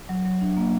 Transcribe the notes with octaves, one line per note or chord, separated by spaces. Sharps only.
F#3
F#3
D4
A#3